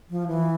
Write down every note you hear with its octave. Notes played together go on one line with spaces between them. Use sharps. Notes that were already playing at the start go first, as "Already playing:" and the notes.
F3
E3